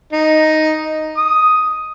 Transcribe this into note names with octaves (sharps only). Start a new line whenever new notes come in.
D#4
D#6